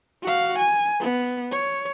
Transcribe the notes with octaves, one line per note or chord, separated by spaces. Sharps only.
F#4 F5
G#5
B3
C#5